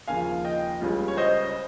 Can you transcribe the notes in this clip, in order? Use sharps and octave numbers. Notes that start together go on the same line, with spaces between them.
D#2 C#3 F3 F5 G#5
D#5 G5
C#2 C#3 G3 C#4 F4
C#5
C5 D#5